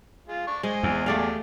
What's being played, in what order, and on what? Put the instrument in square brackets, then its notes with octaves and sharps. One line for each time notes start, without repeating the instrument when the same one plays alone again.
[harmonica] G#3 F4
D4 C#6
[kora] G#3 [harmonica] C5 D#5 G#5
[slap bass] E2
[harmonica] G#3 G4 [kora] A3 D5 F5